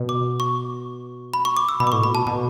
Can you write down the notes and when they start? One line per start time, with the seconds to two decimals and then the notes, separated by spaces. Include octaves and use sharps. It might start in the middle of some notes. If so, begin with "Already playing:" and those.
Already playing: B2
0.09 D6
0.40 C#6
1.34 B5
1.45 C#6
1.57 D6
1.69 E6
1.80 B2 B5
1.87 D6
1.92 A2 C#6
2.03 B2 B5
2.15 A5
2.27 B2 A5